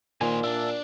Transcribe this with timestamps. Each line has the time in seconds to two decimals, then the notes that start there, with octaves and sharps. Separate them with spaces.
0.21 A#2 D#3 A#3 C5 G#5
0.44 D4 E5 A5